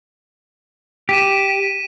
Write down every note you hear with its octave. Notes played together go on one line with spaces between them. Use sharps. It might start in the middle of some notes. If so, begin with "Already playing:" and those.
G4 B6 D#7 E7